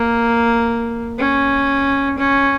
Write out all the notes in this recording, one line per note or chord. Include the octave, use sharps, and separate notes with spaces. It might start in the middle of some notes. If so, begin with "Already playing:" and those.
Already playing: A#3
C#4
C#4